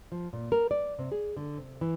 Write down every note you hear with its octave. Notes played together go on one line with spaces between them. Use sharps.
F3
A#2
A#4
D5
C3
G#4
D3
C3
E3